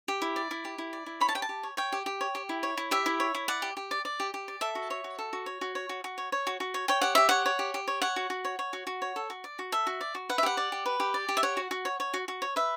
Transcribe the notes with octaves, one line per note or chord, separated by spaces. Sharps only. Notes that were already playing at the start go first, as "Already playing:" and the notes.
G4
E4
D5
E4
G4
E4
D5
E4
C#5 B5
A5
G4 G5
A5
G4
C#5
C#5 G5
G4
G4
C#5
G4
E4
C#5
E4
G4 E5
E4
C#5
E4
D5 F#5
G4
G4
D5
D5
G4
G4
D5
A4 E5
F#4
C#5
F#4
A4
F#4
C#5
F#4
C#5
F#4
F#4
C#5
C#5
F#4
F#4
C#5
C#5 G5
G4 F#5
G4 E5
C#5 F#5
C#5
G4
G4
C#5
C#5 F#5
F#4
F#4
C#5
C#5
F#4
F#4
C#5
A4
F#4
D5
F#4
A4 E5
F#4
D5
F#4
B4 F#5
E5
G4 F#5
D5
G4
B4
G4
D5
G4
E5
C#5 F#5
F#4
F#4
C#5
C#5
F#4
F#4
C#5
B4 E5